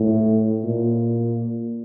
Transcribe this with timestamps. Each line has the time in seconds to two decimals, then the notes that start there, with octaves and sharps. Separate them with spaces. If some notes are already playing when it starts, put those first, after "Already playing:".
Already playing: A2
0.64 A#2